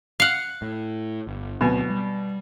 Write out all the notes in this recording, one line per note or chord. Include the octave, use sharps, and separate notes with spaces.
F5 F#5
A2
G1
D2 B2 F#3 C4 G#5
G3